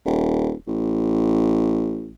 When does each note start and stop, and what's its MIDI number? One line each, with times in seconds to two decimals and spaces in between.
0.06 0.53 27
0.67 2.15 33